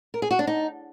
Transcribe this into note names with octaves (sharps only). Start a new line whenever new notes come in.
A#4
G#4
F#4
D4
D#4